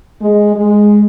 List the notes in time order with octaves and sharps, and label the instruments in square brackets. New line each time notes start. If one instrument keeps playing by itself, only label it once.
[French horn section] G#3
G#3